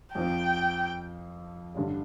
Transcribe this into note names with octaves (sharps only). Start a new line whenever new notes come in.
F2 F3 C4 G5
A1 G2 D3